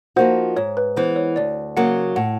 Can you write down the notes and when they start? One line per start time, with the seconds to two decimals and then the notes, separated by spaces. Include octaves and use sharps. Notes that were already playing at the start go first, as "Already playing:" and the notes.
0.16 F3 A#3 D#4 F#4 C5
0.57 G#2 C#5
0.77 B4
0.96 E3 G#3 B3 C5
1.16 C#5
1.36 D2 D5
1.77 C#3 F#3 A#3 F#5
2.16 A2 F#5